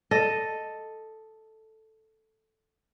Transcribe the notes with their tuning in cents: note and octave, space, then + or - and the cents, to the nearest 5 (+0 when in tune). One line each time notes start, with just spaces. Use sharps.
A4 +0 D#5 +0